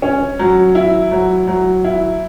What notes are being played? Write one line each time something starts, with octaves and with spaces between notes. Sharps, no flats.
C#4
F#3
E4
F#3
F#3
E4